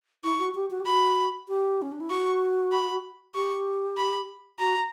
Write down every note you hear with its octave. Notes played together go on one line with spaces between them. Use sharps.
E4 C#6
F#4
G4
F#4
G4
F#4 B5
G4
C#4
D4
E4
F#4 C#6
B5
G4 C#6
B5
F#4 A#5